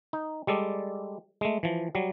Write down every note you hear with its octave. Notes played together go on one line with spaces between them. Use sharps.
D#4
G3 G#3 A4 D5
G#3 A3
E3 F3
F#3 G3